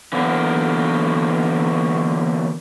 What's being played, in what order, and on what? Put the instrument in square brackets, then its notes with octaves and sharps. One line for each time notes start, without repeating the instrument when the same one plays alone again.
[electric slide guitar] D3 E3 F#3 A#3 B3